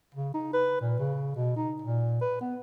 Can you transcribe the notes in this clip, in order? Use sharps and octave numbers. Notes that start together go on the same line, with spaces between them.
C#3
D#4
B4
A#2
C#3
B2
D#4
A#2
B4
B3